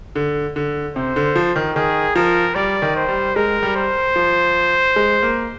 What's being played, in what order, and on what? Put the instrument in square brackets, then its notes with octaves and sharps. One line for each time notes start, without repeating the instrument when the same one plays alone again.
[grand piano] D3
D3
[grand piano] C3 [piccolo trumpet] C5
[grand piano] D3
F3
D#3
[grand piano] D#3 [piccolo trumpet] G#4
[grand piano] F3 [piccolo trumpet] A#4
[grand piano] G3 [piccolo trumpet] D5
[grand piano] D#3
[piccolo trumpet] C5
[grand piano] G3
[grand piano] G#3 [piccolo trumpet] A#4
[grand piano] G3
[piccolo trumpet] C5
[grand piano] F3
G#3
A#3